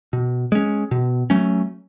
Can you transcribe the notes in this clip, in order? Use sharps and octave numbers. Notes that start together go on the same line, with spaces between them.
B2
G#3 C#4
B2
F#3 A3 C#4